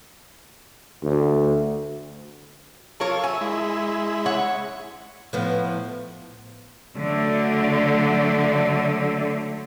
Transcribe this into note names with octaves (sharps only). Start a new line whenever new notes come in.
D2
F#3 F4 A4 A#4 C#5
E5 G#5
G#3 E4
C#5 F#5
A2 F3 B3
D3 F#3 A3